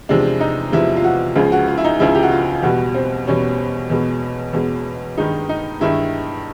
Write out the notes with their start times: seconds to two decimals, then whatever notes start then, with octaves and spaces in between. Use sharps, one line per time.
0.09 E2 C3 F3 G#3 D4
0.40 D#4
0.72 E2 C3 F3 G#3 E4
0.96 F4
1.04 F#4
1.36 C#2 C#3 F3 G#3 F4
1.52 F#4
1.67 F4
1.77 E4
1.84 D#4
1.99 C#2 C#3 F3 G#3 E4
2.15 G4
2.23 F#4
2.32 F4
2.63 E2 B2 G3 F#4
2.94 C4
3.27 E2 B2 G3 C#4
3.90 E2 B2 G#3
4.53 E2 B2 G#3
5.17 G2 D#3 G#3 D#4
5.49 D#4
5.80 G2 D#3 G#3 E4